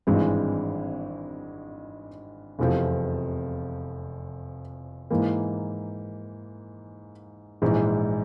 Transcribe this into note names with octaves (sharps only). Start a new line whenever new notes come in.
G#1 G2 E3 G#3 C4
F1 E2 C3 F3
G#2 E3 A#3
A#1 G#2 E3 G#3